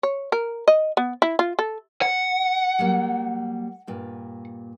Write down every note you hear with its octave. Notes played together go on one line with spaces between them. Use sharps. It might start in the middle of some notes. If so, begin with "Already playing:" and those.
C#5
A#4
D#5
B3
E4
F4
A4
F#5
F#3 G3 A#3
G2 A#2